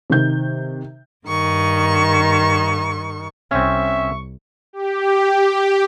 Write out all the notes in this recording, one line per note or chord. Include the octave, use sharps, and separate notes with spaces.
C3 D#3 G6
G2 D#3 C#6
C2 C4 C#4 E5 C#6
G4